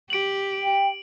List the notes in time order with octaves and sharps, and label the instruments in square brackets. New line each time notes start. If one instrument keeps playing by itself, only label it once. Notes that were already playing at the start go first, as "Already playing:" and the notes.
[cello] G4 [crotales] D7 F#7
[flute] G5